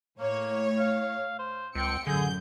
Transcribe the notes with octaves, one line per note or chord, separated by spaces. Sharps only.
A2 A#3 C#5
F5
C5
C#2 C4 G5 C#7
A1 F#2 D3 G#4 G6